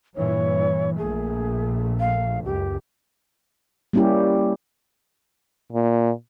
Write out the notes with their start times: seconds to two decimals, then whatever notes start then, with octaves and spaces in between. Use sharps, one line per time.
0.16 G2 A#2 E3 C#5
0.98 A#1 A#2 A3 G#4
2.00 F5
2.45 C#2 F#2 G4
3.93 G3 A#3 C#4 E4 G4
5.72 A#2